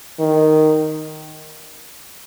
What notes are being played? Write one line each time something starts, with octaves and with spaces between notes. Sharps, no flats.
D#3